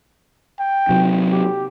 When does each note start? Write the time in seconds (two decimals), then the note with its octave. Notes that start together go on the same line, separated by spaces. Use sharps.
0.59 G5
0.89 C3 F#3
1.31 G4